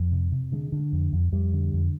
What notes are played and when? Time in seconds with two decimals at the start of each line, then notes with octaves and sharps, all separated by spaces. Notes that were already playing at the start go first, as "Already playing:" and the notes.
Already playing: F2
0.12 C3
0.32 C3
0.52 D3 G#3
0.72 D3
0.92 F2
1.13 F2
1.32 F2 G3
1.53 D3
1.73 F2